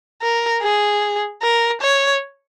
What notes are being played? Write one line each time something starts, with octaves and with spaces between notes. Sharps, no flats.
A#4
G#4
A#4
C#5